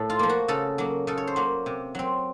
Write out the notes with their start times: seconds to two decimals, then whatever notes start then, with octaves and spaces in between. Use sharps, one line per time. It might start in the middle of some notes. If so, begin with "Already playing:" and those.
Already playing: A2 A4
0.10 F4
0.19 F3 A#3
0.29 F#4
0.48 C#3 A4
0.78 F#3 A#3
1.07 C#3 A4
1.18 C#5
1.27 C5
1.36 F#3 A#3
1.66 C3
1.95 F#3 C4